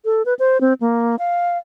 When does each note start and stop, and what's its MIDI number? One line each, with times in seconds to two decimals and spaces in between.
0.05 0.22 69
0.26 0.34 71
0.39 0.60 72
0.61 0.73 60
0.81 1.16 58
1.19 1.58 77